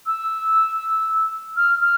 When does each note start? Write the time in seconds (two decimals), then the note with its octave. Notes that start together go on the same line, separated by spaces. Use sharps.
0.06 E6
1.56 F6
1.81 F6